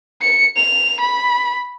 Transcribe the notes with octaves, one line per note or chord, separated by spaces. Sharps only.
C#7
F7
B5